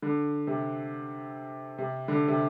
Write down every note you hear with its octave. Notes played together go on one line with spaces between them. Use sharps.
D3
C3
C3
D3
C3